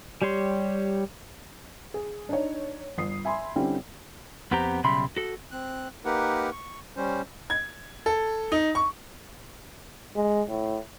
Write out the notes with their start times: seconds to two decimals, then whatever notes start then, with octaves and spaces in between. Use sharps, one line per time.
0.22 G3 G4 C#5 C6
1.94 G#4
2.29 D4 D#4 C#5
2.98 G1 D#6 C7
3.25 E5 G#5 B5 C6
3.56 D3 G3 C4 C#4 E4
4.51 F2 B3 C4 G4 C5 A#5
4.84 B1 C#3 G3 E5 B5 C6
5.17 F#4 A4
5.51 C4 F#6
6.05 A#3 D#4 G4 A#4 B4 F#5
6.52 C#6
6.96 G3 C#4 C5
7.50 G#6
8.06 A4
8.52 D#4
8.75 C#6
10.16 G#3
10.50 A2